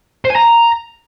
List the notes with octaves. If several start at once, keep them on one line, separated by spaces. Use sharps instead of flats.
C5
G#5
A#5